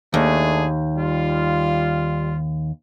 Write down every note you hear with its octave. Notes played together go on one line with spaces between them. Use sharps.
D#2 A3 D4 G#4
G3 F4